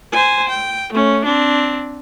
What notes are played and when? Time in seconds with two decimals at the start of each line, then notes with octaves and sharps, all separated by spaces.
0.12 C5 G#5
0.49 G5
0.93 A3 C#4
1.25 C4 D4